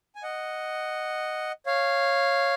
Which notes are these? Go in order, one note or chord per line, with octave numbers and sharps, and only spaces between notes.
G#5
D#5 F#5
C#5 F5